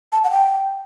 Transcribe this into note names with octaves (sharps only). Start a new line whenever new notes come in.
A5
F#5
G5